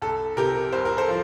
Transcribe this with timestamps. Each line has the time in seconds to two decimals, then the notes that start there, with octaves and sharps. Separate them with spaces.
0.02 C2 A4
0.37 C3 G4 A#4
0.72 C2 C5
0.85 A#4
0.97 A4 C5
1.08 F3